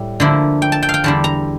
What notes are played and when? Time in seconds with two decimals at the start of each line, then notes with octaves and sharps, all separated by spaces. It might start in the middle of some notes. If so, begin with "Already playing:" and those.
Already playing: A2 G3
0.20 D3 F3 A#3 E4
0.62 G5
0.72 A5
0.83 G5
0.89 F5
0.94 G5
1.04 E2 D3 G3 A5
1.24 A#5